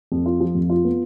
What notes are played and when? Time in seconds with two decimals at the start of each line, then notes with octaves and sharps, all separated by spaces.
0.12 F2
0.26 F4
0.40 F3
0.55 F2
0.70 F4
0.85 B3